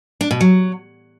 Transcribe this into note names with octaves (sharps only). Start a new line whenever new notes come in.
D4
B2
F#3